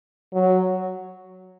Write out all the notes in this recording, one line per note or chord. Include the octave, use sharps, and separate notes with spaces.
F#3